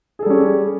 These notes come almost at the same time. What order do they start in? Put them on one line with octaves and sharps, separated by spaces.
G#4 A4 G3 C#4